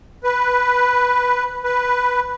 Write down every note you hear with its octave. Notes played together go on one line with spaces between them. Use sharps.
B4
B4